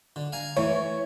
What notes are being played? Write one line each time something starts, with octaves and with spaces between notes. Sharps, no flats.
D3
F5 G#5 A#5
E3 A3 C#5